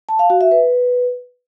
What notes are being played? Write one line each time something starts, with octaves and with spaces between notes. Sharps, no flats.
A5
F5
F#4
E5
B4